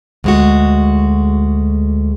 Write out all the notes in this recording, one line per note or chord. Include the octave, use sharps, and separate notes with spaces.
D2 G#3 F#4